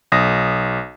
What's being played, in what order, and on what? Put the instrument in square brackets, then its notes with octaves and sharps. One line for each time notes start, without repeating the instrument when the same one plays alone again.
[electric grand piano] B1 D#6 A#6